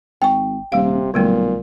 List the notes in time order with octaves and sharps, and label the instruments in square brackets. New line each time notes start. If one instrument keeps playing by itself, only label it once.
[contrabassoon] G#1 [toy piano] G5 [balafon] G#5 C#6
[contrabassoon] D#1 [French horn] C3 [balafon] G3 F5
[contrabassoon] B1 [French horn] A#2 [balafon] D3 G3 A3